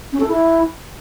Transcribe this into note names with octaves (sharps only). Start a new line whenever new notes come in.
C#4
A4
E4